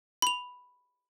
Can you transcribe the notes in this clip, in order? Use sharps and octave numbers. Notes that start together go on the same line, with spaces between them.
B5 F7